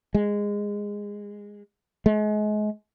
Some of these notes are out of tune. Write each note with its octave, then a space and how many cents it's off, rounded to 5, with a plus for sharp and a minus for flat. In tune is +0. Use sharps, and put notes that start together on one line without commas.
G#3 -15
G#3 +35